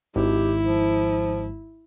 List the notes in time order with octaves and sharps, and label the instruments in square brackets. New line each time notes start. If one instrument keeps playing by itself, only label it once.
[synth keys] G#1 [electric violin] E4 [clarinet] G4
[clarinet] F3